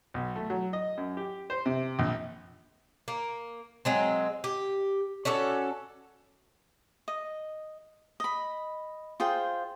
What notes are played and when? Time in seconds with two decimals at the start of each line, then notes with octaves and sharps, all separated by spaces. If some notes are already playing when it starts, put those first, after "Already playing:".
0.14 B1
0.36 A3
0.50 F#3
0.73 D#5
0.97 F#2
1.17 G4
1.50 C5
1.66 C3
1.99 A#1
3.08 A#3
3.85 F#3 G#3 C4
4.44 G4
5.25 C#4 F#4 A4 D5
7.08 D#5
8.20 D#5 B5
9.20 F4 G#4 C5 G5